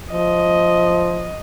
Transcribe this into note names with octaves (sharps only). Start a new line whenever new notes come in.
F3 D#5